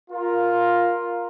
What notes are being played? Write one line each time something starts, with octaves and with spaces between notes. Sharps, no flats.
F4 A#4